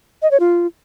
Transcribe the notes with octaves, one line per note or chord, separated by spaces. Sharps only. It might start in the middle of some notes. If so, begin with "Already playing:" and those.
D#5
C#5
F4